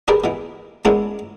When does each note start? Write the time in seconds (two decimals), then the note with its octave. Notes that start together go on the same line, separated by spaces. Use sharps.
0.08 D4 G4 G#4 A#4 B4 D5
0.24 B2 E3
0.85 G#3 B3 C#4 D4 E4 A#4